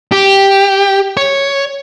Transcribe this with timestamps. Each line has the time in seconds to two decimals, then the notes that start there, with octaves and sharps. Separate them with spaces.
0.12 G4
1.17 C#5